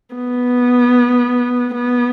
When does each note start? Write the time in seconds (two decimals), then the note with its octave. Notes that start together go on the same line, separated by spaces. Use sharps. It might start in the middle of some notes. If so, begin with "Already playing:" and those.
0.15 B3
1.74 B3